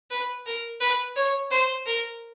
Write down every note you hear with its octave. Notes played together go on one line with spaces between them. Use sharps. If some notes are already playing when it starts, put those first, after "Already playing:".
B4
A#4
B4
C#5
C5
A#4